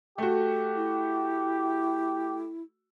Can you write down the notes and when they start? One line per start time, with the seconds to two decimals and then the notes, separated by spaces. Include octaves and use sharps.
0.18 A3 F#4 G4
0.76 E4